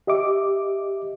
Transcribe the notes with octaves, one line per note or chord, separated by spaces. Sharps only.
G4 D#5 E5 D6